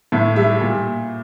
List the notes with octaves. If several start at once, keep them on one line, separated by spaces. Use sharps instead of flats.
A2 E5
G3 E5
A#2